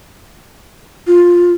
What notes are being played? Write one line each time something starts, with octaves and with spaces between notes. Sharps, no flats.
F4